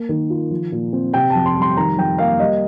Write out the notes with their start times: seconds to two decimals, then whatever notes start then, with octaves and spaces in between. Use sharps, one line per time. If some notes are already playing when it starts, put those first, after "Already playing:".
Already playing: A#3
0.09 D#3
0.30 F4
0.51 F3
0.72 A#2
0.93 C4
1.13 C3 G5
1.30 A5
1.35 F2
1.46 C6
1.56 G3
1.62 C6
1.77 D#3 A#5
1.98 F2 G5
2.18 A#3 F5
2.39 G3 D#5